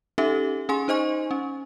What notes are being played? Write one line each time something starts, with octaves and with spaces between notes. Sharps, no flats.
C#4 D#4 G4 A4 E5
C#4 G#4 G#5 C6
D#4 C5 D#5 G#5 C#6
C#4